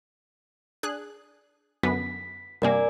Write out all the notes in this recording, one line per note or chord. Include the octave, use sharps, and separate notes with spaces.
D4 G#4 F#6
F#2 D3 B3 B6
G2 C3 A#3 A#4 D5 G#5